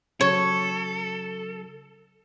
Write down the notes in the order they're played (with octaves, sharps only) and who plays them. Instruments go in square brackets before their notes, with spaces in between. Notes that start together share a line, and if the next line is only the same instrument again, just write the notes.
[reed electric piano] C#3 F#3 [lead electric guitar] A4 [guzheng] C#5